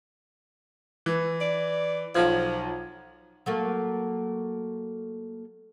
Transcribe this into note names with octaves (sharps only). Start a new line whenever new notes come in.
E3
D5
B1 F3 F4 G#6
F#3 A3 A#3